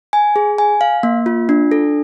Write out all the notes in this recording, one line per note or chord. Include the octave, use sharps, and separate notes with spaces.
G#5
G#4
G#5
F5
A#3
F4
D4
A4